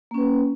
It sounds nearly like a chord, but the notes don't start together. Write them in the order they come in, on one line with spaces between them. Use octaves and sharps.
A#3 C#4 B4